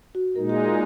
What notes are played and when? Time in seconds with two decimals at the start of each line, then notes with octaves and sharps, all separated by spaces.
0.15 F#4
0.36 A#2 G#3 D#4 A#4
0.49 G#4